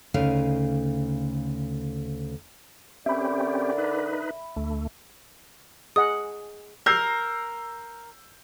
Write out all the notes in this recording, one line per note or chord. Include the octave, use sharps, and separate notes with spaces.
D2 C#3 D#4 F5
D3 C4 C#4 G4 A#4 D5 E5 B5
D#4 B4
D2 A3
G#4 D#5 F#5 D#6
A#4 E6 G6 C7